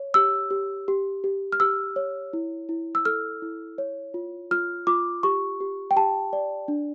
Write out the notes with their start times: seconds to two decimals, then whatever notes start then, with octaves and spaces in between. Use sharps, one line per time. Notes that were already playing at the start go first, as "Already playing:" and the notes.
Already playing: C#5
0.14 G4 E6
0.51 G4
0.88 G4
1.24 G4
1.53 F6
1.60 G4 E6
1.96 C#5
2.33 E4
2.69 E4
2.95 E6
3.05 A4 F6
3.42 E4
3.78 C#5
4.14 F4
4.51 F4 F6
4.87 F4 D6
5.23 G4 C#6
5.60 G4
5.91 G5
5.96 G4 A5
6.33 D5
6.68 D4